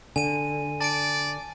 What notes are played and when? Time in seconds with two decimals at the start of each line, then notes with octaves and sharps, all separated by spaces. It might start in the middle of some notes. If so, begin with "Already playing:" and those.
0.16 D3 G#5 D#7
0.81 D5 A5 D7